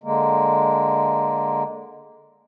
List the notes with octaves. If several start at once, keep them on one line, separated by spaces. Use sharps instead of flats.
D3 G#3 A#3